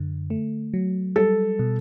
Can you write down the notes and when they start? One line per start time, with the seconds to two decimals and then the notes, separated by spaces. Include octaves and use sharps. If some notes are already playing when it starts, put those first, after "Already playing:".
Already playing: F#2 D3
0.30 A3
0.74 F#3
1.16 G3 A4
1.59 B2